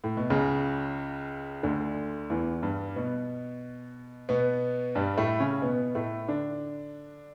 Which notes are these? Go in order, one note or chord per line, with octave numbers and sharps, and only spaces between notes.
A2
B2
C#2 C#3
D2 D3
E2 E3
G2 G3
B2 B3
B2 B3
G2 G3
A2 A3
C#3 C#4
B2 B3
A2 A3
D3 D4